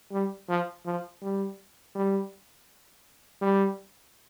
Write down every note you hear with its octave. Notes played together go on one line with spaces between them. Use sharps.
G3
F3
F3
G3
G3
G3